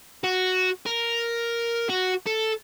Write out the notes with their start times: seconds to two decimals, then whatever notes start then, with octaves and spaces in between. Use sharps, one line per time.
0.24 F#4
0.86 A#4
1.89 F#4
2.26 A4